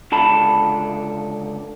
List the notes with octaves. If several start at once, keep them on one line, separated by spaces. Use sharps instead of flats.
C#2 D3 A5 B5